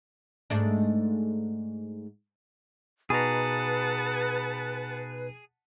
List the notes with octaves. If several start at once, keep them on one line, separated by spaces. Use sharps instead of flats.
G#2 A3 D4
B2 D#4 G#4 B4 F#5 A5 A#5